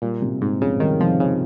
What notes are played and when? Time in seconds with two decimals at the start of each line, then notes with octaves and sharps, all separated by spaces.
0.02 A#2 G3
0.22 C3
0.41 G#2 C4
0.61 F2 C#3
0.80 D#3 G3
1.00 C3 F3
1.20 C#3 C4